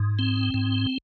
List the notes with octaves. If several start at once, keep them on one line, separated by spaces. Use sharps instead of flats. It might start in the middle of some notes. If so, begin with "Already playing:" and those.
Already playing: G#2
C4
G#2